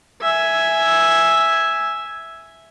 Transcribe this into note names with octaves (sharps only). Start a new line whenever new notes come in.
E5 G#5